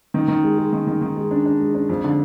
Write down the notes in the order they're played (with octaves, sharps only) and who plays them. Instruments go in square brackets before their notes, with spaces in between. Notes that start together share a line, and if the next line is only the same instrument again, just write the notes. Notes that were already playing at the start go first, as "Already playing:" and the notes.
[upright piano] D#3
D#3
G#3
G#3
D#3
D#3
D#3
G#3
D4
D4
G#3
D4
F2
D3